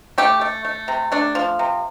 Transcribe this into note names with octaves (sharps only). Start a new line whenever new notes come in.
A3 G4
A3
A3
C3
A3 D4
F3
C3